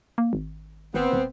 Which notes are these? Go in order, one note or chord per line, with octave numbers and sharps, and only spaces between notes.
A#3
G#1
G#1 B3 C4
D#1